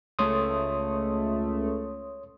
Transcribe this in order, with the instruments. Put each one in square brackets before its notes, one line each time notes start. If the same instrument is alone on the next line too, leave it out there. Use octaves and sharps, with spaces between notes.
[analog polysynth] C#2 A3 [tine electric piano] C#5 C6 D#6